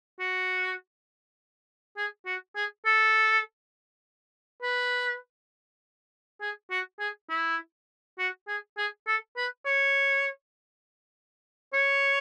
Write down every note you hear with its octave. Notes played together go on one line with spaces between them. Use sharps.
F#4
G#4
F#4
G#4
A4
B4
G#4
F#4
G#4
E4
F#4
G#4
G#4
A4
B4
C#5
C#5